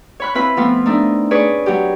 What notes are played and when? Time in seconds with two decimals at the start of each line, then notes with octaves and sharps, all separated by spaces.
0.20 C#5 B5 F#6
0.35 C4 E4 F4 B4 B5
0.57 F3 A3 B3 C4 F4
0.86 A3 D4 D#4
1.31 G#4 B4 C#5 D5
1.66 F#3 F#4 G4